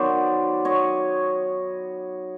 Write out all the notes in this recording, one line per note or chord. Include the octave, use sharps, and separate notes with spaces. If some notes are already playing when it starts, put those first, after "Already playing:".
Already playing: D#3 F#3 B3 C5 D5
C#5 D#5